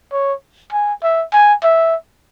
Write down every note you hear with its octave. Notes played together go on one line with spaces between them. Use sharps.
C#5
G#5
E5
G#5
E5